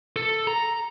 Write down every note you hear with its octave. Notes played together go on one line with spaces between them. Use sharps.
A4
A#5